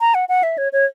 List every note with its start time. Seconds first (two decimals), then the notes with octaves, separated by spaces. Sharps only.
0.01 A#5
0.15 F#5
0.29 F#5
0.43 E5
0.58 C#5
0.73 C#5